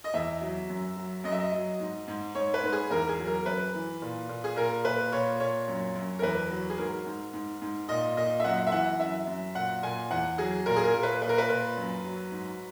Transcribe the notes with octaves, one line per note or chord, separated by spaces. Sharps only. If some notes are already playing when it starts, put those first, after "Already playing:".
D#5
E2 E5
F#3
F#2
F#3
F#2 D#5
E5
D#5
F#3
G#2
G#2
G#2 C#5
B4
G#2
G#4
E2 A#4
G#4
F#3
A#4
F#2 B4
E3
A#2
A#2
G#4
A#2 A#4
A#2 B4
A#2 C#5
A#2 C#5
F#2
F#2
A#4
E2 B4
F#3
G#4
G#2 A#4
G#2
G#2
G#2
A#2 D#5
A#2 D#5
E5
F#2 F#5
E5
E3 F#5
F#2 E5
F#2
A#2 F#5
A#2 G#5
E2 F#5
F#3 G#4
A#2 A#4
G#4
A#4
A#2
B4
A#2 B4
A#4
B4
A#2
F#2
F#3
G#2